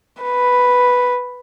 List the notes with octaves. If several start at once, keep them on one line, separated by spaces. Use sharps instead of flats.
B4